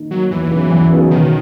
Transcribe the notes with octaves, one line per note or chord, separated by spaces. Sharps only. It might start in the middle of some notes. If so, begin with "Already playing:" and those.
Already playing: D#3 A#3 D#4
F#3 A#3 D#4
E2 E3
C#3 F#3 B3 D#4
E2
C#3 F#3 B3 D#4
B2 D#3